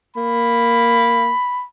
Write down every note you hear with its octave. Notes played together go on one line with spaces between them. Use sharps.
A#3 B5